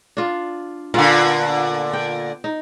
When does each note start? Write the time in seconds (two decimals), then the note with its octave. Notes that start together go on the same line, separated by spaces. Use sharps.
0.17 D4 F4
0.94 A#2 D3 B3 F4
1.93 G5
2.44 D#4